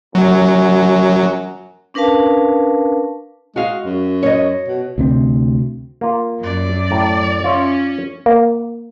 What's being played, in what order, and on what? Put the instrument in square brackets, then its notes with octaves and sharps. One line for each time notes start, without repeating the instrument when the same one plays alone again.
[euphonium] F#2 [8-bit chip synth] F#3
[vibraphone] C#4 D4 A#4 B4 F5 A5
[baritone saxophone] G#3 [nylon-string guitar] F#4 F5
[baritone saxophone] F#2
[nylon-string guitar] C#5 D#5
[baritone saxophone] B2
[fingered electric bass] D2 C3 B3 C4
[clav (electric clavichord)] A#3 F4
[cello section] F#2 [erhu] D5
[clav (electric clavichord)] A2 A#5
[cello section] C#4 [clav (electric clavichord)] F4 C#5 E5
[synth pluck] A#3